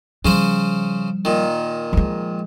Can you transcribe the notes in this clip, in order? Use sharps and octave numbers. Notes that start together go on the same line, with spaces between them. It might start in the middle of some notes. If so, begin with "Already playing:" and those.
C#3 F3 G3 C#4 C5
A#2 D#3
F3 G#3